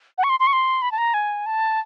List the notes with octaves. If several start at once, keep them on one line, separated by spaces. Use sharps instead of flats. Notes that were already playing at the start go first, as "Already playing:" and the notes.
F#5
C#6
C6
C6
C#6
C6
B5
A5
A#5
G#5
A5